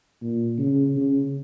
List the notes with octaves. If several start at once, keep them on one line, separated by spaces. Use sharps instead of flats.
A#2
C#3
C#3